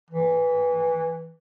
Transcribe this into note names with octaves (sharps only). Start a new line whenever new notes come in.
E3